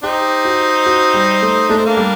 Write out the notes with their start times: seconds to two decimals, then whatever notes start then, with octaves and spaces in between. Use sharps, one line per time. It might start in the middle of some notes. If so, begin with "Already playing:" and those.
0.03 C4 D#4 G4
0.45 F#4
0.86 F#4
1.14 G3
1.42 A3
1.69 A3 D4
1.77 C4
1.86 A#3 D4
1.97 G3